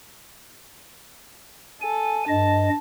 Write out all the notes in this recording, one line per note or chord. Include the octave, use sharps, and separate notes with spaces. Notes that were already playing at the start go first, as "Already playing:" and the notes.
A4 G#5
G2 D#5 A5